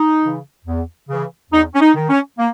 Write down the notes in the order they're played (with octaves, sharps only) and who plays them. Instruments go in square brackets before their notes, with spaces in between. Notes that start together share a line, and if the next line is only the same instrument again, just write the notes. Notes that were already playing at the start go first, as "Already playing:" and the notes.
Already playing: [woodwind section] D#4
C#3 E3
E2
C#3 E3
E2 D#4
C#4
D#4
D#3
C#4
A#3